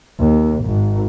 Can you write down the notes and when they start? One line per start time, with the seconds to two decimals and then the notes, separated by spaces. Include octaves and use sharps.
0.19 D#2
0.64 G#1